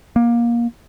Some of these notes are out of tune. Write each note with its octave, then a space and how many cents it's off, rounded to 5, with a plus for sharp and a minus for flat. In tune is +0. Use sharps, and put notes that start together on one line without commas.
A#3 +20